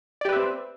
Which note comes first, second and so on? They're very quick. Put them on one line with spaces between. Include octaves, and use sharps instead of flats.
D5 G4 B4 E5 C4